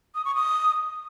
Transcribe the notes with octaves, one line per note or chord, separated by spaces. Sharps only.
D#6
C#6
D#6